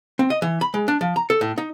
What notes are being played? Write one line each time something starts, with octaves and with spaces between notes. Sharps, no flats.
C4
D#5
E3
B5
G#3
D4
F3
A#5
A4
A2
D#4